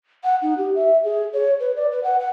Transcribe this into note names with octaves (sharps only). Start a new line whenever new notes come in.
F#5
D#4
G4
E5
G#4
C#5
B4
D5
B4
F#5
F#5